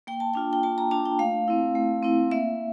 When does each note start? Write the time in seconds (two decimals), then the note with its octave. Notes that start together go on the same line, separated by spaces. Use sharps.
0.07 A#3 G5
0.20 A5
0.34 D4 F4 G5
0.53 G5
0.63 A#3 A5
0.78 A#5
0.91 D4 F4 A5
1.06 G5
1.19 A3 F5
1.48 C4 E4
1.75 A3
2.03 C4 E4
2.31 A#3 E5